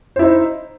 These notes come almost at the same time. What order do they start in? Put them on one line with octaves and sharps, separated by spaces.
C5 E4 D#4